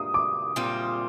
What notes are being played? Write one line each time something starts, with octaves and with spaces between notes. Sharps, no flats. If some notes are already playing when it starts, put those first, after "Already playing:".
Already playing: A#2 G3 A#3 D#6
D6
A#2 G3 C4 F4